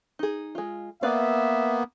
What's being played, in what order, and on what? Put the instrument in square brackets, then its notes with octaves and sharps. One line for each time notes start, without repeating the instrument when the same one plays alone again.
[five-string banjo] D#4 G#4
G#3 F4
[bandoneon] A#3 B3 [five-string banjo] B4 D5 F5 [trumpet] E5